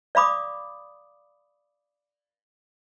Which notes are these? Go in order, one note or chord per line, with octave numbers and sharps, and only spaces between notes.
D5 F5 B5 D6 D#6